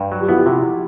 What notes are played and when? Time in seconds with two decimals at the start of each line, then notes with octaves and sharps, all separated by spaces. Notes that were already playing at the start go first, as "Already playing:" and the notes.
Already playing: G2
0.12 F#3
0.20 F4 G4
0.28 B3 E4 F#4
0.37 F4 G4
0.46 C3 E4 F#4